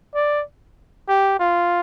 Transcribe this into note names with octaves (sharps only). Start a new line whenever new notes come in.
D5
G4
F4